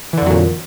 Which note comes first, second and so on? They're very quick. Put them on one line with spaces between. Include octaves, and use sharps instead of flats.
E3 D3 F2 F#3 A#2